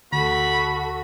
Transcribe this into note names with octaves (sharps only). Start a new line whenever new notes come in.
D2 F#4 A4 B5